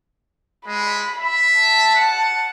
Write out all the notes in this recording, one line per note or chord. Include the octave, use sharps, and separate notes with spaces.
G#3 B5
E5
A5
F#5